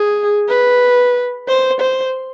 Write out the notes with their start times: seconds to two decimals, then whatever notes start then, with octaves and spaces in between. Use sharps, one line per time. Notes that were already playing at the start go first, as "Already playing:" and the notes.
Already playing: G#4
0.49 B4
1.48 C5
1.80 C5